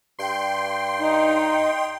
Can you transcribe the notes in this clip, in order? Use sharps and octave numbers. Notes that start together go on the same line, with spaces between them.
G2 G5 C6
D#4